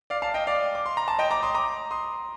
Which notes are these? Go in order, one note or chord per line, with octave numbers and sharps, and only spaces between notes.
D5 F5
F5 A5
D#5 G5
D5 F5
D6
C6
A#5
A5
D#5 G5
A#5 D6
C6 D#6
A#5 D6
C6 D#6